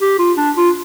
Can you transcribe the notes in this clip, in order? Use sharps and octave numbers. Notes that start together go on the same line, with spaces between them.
G4
F4
D4
F4